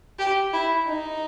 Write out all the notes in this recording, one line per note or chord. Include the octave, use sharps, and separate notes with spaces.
G4
E4
D#4